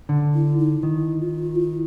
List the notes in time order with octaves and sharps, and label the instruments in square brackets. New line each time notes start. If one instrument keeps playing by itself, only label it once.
[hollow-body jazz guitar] D3
[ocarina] E4
D#4
[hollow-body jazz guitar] D#3 [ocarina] E4
[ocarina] F4
E4